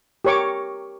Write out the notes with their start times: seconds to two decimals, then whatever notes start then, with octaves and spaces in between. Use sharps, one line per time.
0.25 G4 A#4 C#5 C#6 D6